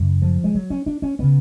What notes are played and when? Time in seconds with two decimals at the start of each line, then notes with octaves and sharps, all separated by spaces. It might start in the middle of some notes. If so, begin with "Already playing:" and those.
Already playing: F#2 C#3
0.22 F3
0.44 G#3
0.55 F#3
0.70 C#4
0.86 D4
1.02 C#4
1.19 C#3 B3